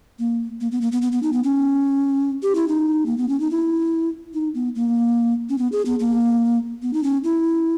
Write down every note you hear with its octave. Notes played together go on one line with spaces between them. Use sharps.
A#3
A#3
B3
A#3
B3
B3
B3
D#4
B3
C#4
G4
E4
D#4
A#3
B3
C#4
D#4
E4
D#4
B3
A#3
C#4
B3
G#4
B3
A#3
B3
D#4
C#4
E4